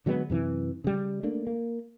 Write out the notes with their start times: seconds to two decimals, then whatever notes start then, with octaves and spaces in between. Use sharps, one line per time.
0.06 D3 F#3 G#3 B3
0.30 F#2 C3 E3
0.84 C#3 G3
1.23 A3 A#3 D4
1.47 A#3